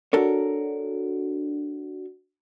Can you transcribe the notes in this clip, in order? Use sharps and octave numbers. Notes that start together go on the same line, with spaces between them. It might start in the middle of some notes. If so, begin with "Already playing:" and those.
D4 F#4 A4 A#4 C#5